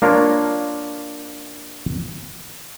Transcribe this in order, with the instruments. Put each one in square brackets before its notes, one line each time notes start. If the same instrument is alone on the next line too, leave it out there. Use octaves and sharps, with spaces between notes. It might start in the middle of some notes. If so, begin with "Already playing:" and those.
[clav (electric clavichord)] A#3 D4 F4 A#4 C#5